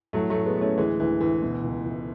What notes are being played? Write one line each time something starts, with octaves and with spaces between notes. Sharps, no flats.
A1 F#3 A3
A1 F#3 A3
G#3 B3
A2 A3 C#4
D2 E3 G#3
D2 E3
D2 E3
B2
C#2
C#2